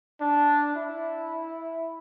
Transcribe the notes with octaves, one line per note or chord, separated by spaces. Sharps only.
D4
E4